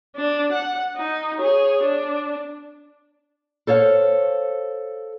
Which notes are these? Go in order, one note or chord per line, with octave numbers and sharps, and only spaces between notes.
D4
F#5
D#4
G#4 C#5
D4
A4 C5 C#5 F5